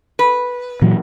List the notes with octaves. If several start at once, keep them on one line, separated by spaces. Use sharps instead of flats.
B4
A#2 E3 F#3